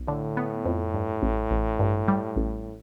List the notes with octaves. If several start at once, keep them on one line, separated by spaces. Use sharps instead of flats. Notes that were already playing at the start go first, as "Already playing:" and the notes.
Already playing: B1
A2 D3
B3
F2
G2
A1
A1
G2
G3
A1